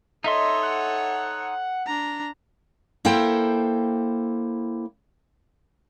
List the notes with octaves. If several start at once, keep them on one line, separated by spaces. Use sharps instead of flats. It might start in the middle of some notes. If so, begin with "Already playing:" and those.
D#4 A4 C#5 D#5 E5 C6
F#5
D4 A#5
A#3 E4 A4 C5 G5